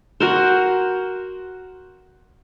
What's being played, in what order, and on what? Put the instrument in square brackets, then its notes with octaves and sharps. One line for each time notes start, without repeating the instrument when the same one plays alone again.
[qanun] F#4 A#4 C5